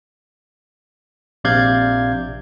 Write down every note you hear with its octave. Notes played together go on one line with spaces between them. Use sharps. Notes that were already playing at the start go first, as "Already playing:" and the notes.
A#1 C3 D5 F5 G6 G#6